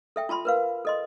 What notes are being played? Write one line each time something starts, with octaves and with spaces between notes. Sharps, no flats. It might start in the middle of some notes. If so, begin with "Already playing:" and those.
A4 E5 G5
F4 A5 B5 C6
A#4 B4 F5
A4 D#5 C6